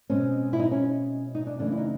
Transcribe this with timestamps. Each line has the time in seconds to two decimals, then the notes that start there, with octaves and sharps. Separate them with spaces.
0.10 B2 G#3 C4 C#4
0.53 E4
0.59 D#4
0.71 C#4
1.35 D#4
1.47 D4
1.59 F#2 C#3 E3 A3 D4
1.72 E4
1.77 D#4